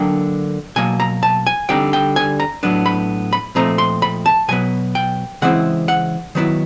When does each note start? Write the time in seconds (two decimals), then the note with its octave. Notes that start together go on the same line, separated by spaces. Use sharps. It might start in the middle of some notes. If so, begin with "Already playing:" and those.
Already playing: D3 F#3 A#3 D4 G5
0.76 B2 F#3 A#3 G#5
1.00 A#5
1.23 A5
1.46 G#5
1.69 D3 G3 C4 D#4 G5
1.93 G5
2.16 G#5
2.40 A#5
2.63 A2 F#3 B3 D4
2.86 B5
3.33 B5
3.55 A#2 F3 A3 C4 D#4 A#5
3.78 C6
4.02 B5
4.26 A5
4.48 B2 F#3 B3 G#5
4.95 G5
5.42 C#3 E3 G#3 C4 E4 F#5
5.88 F#5
6.35 D#3 F#3 B3 E4